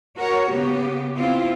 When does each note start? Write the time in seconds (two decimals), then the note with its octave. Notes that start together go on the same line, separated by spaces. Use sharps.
0.17 F#4 A#4 C#5
0.51 C#3 B3 G4
1.17 C4 E4 F4